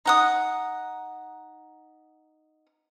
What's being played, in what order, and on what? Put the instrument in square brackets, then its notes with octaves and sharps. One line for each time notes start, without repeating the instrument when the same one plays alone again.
[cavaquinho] D#4 F#5 D#6